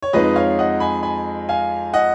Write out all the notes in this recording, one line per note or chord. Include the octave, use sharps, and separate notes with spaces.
C#5
F2 F3 G#3 D#4 B4 D#5
C#5 F5
D#5 F#5
G#5 B5
G#5 B5
F5 G#5
D#5 F#5